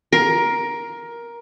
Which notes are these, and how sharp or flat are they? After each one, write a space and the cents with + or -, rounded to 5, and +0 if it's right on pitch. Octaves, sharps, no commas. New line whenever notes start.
A#4 +15